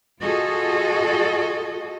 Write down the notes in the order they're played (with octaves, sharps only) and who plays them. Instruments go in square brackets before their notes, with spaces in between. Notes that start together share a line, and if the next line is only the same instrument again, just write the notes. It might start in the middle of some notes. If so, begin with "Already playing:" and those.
[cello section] F4 F#4 G#4 A4 D#5